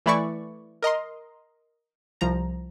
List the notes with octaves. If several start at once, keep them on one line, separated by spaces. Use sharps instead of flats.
E3 A3 E4 D5 C#6
A#4 D#5 A#5 C6
C2 F3 A#5